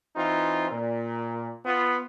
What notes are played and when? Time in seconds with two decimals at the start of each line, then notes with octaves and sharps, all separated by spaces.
0.16 E3 C4 D#4 F4
0.71 A#2
1.65 B3 F4